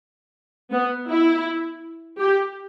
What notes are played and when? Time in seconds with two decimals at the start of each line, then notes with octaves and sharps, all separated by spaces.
0.71 B3
1.08 E4
2.19 G4